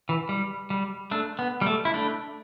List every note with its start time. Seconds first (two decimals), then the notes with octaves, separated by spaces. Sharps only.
0.09 E3
0.29 G3
0.70 G3
1.11 A3 D4
1.39 B3
1.61 G3
1.66 A3
1.85 E4
1.94 A3 D4